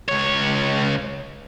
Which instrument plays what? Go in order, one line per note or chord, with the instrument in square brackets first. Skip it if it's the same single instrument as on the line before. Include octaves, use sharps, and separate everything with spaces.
[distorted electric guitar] C#2 C#5